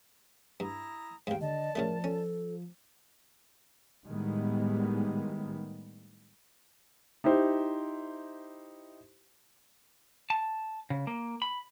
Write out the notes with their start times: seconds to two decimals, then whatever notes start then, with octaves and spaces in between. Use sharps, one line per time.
0.60 G2 E4 A#5 D#6
1.27 D#2 G#2 F5 G5
1.41 D3 D5 D#5 A5
1.75 A2 C#3 F3 A3 A#4
2.04 C#4 A4
4.06 A2 D#3 G3 G#3 B3
7.24 D#4 E4 G4 C5
10.30 A5
10.90 C#3
11.07 A#3
11.42 B5